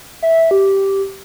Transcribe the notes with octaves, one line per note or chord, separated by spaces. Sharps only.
E5
G4